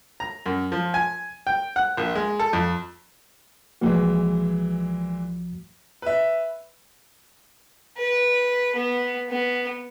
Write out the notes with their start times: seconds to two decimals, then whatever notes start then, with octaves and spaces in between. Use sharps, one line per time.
0.20 A#5
0.46 F#2
0.72 F3
0.94 G#5
1.47 G5
1.76 F#5
1.97 A#1
2.15 G#3
2.39 A4
2.53 F2
3.81 C2 A#2 E3 F3 G#3 F#4
6.02 B4 E5
7.97 B4
8.75 B3
9.29 B3